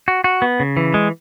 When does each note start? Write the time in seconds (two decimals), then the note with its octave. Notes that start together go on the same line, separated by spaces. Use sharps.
0.08 F#4
0.24 F#4
0.42 B3
0.60 C#3
0.77 E3
0.94 G#3